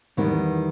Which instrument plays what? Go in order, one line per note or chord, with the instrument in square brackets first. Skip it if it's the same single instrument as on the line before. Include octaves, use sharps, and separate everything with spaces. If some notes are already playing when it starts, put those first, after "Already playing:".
[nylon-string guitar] E2 D#3 G3 B3